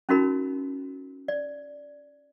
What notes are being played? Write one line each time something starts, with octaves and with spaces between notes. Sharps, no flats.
C#4 D#4 E4 F#4 A#4 B5
D5